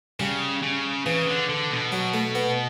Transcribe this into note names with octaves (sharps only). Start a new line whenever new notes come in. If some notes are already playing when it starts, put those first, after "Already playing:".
C#3 G3
C#3
C#3 E3
D3
D3
B2
F#3
A3
B3